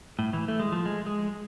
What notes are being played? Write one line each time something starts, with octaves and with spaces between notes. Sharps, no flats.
A2
E3
A3
G#3
F3
G#3
G#3